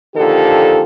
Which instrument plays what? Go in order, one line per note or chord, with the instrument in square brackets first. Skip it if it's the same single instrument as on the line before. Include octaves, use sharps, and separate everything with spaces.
[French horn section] A#2 D3 D#3 F3 G4 A4